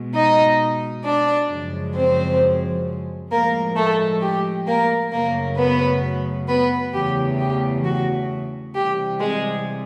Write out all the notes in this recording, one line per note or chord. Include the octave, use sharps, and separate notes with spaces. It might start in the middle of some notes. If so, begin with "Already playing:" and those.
Already playing: B2 G#3
D#4 D#5
D4 D5
F#2 C#3 F3 G#3
C4 C5
A2 F3 G#3 A#3 A#4
A3 A4
G4
A#3 A#4
F#2 C#3 F#3 A3 A#3 A#4
B3 B4
B3 B4
E2 C#3 E3 A3 G4
G4
F#4
C3 E3 G3 G4
G#3 G#4